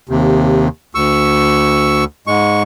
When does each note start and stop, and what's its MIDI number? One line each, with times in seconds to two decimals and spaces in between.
0.09 0.68 39
0.09 0.68 48
0.95 2.04 38
0.95 2.04 85
0.95 2.04 88
2.27 2.63 44
2.27 2.63 56
2.27 2.63 85